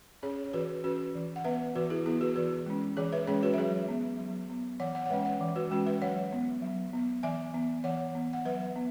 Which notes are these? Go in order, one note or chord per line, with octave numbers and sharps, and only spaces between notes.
C#4 G#4 C#5
C#5
E3 F#4 B4
C#4 F#4 B4
E3
F#5
B3 B4 E5
E3 F#4 B4
E4 G#4
B3 E4 G#4
F#4 B4
E3 F#4 B4
G#3 C#4
E3 G#4 C#5
B4 E5
G#3 C#4 G#4 C#5
F#4 B4
E5
F#3 G#4 C#5
B3
F#3
B3
E3 C#5 F#5
C#5 F#5
F#5
G#3 C#4 B4 E5
C#5 F#5
E3
F#4 B4
G#3 C#4 F#4
B4 E5
F#3 C#5 F#5
B3
F#3
B3
E3 E5 G#5
B3
E3 C#5 F#5
B3
F#5
F#3 B4 E5
B3